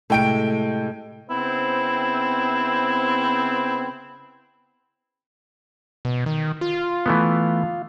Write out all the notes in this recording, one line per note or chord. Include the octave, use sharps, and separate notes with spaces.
A2 C3 G#3 A4 G5 D7
C#3 B3 C4 E4
B2
D#3
F4
E3 A3 B3